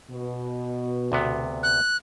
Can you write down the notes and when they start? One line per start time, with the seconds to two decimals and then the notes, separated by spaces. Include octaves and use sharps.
0.11 B2
1.12 D2 C3 B3
1.63 F#6